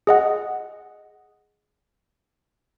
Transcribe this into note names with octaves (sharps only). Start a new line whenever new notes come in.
G#4 D#5 F#5